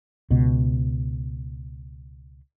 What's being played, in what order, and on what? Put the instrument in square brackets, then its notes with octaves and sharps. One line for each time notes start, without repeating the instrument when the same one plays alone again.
[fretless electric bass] C#2 B2